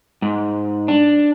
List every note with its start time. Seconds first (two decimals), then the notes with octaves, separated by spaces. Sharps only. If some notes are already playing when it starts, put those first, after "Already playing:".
0.22 G#2
0.88 D4